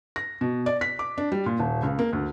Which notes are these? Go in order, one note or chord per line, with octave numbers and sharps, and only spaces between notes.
A#6
B2
D5
B6
D6
D4
G3
A#2
D#1
C#2
A#3
D2